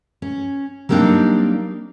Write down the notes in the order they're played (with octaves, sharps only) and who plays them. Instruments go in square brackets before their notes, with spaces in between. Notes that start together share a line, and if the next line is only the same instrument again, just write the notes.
[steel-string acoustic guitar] C#4
F#3 G3 A#3 C4 D4 D#4